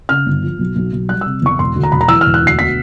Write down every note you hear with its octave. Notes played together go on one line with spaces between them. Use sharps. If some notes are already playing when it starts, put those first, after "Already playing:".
C#3 F6
G1
F3
B1
B1
B1
G3 F#6
C3 E6
E2 C#6
E1 C6
D2
A#5
E1 B5
A#5
E3 E6
E1 F6
F#6
D2 C7
B2 B6